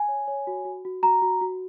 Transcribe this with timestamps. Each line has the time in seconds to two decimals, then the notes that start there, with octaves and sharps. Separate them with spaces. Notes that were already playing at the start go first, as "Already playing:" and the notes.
Already playing: G#5
0.08 C#5
0.28 C#5
0.47 F#4
0.65 F#4
0.85 F#4
1.03 F#4 A#5
1.22 F#4
1.41 F#4